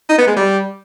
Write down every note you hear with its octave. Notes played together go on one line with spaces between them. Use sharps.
D#4
B3
G#3
G3